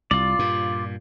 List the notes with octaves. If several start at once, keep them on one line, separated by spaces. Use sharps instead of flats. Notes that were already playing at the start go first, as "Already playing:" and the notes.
C2 F4 D5
G2 A#2